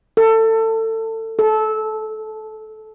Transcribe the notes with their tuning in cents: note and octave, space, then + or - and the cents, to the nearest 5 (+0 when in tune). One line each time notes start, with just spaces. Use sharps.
A4 +25
A4 -20